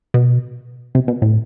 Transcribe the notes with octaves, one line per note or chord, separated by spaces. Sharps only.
B2
C3
B2
A2